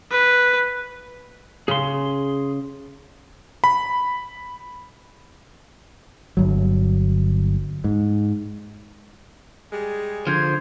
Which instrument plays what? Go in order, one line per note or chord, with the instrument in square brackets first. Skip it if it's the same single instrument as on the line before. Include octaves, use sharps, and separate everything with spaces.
[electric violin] B4
[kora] C#3 [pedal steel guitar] G#4 C6
[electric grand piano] B5
[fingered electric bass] G1 F#3
G#2
[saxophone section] G3 G#3 G#4
[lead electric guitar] D3 F3 [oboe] C5 [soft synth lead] G#6